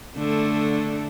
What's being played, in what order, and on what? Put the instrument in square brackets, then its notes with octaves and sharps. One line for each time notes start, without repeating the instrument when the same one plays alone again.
[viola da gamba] D3 A3